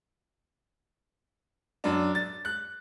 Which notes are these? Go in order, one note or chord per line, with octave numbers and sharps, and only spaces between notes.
F#2 D4
A6
F#6